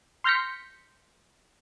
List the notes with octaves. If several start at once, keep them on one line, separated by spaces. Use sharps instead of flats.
C6 F6 G6 A#6 B6 C#7